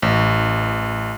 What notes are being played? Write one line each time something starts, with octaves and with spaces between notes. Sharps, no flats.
A1